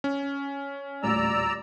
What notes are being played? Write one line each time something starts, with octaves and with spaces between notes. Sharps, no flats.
C#4
D#1 A1 D2 D5 A#5 E6